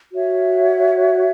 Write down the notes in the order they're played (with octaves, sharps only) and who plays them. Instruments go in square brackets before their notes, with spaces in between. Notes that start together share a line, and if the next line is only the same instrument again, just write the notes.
[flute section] F#4 C#5 E5